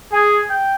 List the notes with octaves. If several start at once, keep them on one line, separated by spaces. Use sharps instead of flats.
G#4 G#5
G5